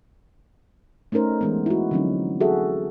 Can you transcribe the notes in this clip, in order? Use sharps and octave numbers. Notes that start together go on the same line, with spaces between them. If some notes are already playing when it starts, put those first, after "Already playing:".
A3 C#4 D#4 A#4 C5
E3 G#3 B3
E4 F#4
D3 F3 F#3 C4 C#4 D#4
F#4 G#4 A4 E5